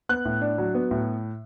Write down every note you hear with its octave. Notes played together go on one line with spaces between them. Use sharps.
B3 F#6
A2
D4
F#3
B3
A2